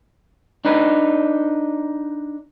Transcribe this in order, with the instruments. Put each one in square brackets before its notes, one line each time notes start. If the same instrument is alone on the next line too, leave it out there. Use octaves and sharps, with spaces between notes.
[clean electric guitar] D4 D#4 B4